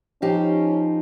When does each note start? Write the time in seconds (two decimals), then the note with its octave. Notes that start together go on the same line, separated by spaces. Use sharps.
0.22 F3 C#4 D#4 G4